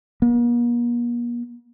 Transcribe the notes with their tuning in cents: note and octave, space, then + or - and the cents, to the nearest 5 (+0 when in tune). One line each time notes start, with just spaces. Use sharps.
A#3 +45